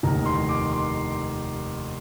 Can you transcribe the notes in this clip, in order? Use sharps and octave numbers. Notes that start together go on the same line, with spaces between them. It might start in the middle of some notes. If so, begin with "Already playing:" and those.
F1 D#2 D#3 A#5
C6
D6
C6